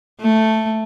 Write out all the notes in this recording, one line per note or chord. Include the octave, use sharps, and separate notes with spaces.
A3